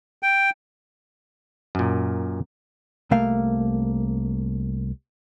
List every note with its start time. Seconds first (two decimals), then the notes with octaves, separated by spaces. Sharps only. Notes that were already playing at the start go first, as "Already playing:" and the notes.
0.23 G5
1.75 F#2 A#2
3.11 C2 A3 A#3 F5